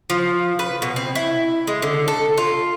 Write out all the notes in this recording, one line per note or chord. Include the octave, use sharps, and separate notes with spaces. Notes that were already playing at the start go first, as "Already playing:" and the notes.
F3
B4
B2
C4
E4
G#3
D3
A4
F4